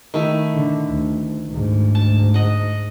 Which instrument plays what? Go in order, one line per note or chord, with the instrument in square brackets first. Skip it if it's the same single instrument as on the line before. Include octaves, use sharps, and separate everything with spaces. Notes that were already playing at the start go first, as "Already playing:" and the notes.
[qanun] D#3 A3 E4
[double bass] D3
D2
D2 G#2
[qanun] A5
D#5 F#5